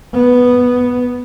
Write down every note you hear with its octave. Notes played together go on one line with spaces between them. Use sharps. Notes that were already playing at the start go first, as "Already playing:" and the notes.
B3